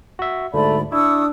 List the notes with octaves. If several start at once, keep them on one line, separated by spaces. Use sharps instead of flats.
F#4 E5
D2 G#2 A3 D5 B5
D4 E4 C#6 D#6 E6